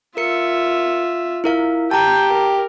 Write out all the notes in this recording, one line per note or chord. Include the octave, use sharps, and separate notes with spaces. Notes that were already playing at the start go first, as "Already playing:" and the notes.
F4 A#4 E5 C#7
E4 A#4 F5
G4 G5 A5 A#5
A#4